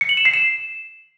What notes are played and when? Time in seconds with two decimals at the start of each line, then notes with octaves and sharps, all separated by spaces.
0.01 C#7
0.09 F#7
0.17 E7
0.25 C7
0.34 E7